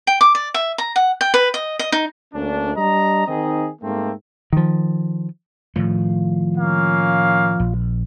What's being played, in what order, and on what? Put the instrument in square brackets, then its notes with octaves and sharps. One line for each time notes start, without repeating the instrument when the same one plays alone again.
[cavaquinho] G5
D6
D5
E5
A#5
F#5
G5
B4
D#5
D#5
D#4
[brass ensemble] D2 A#3 C#4 D4
G3 D4 D#5 A#5
D#3 C4 D#4 G#4 D#5
G#2 A3 A#3 C4
[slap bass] D#3 F3
[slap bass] A2 D#3 A3 [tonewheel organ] F3
[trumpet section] A#3 C#4 F5
[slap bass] A#1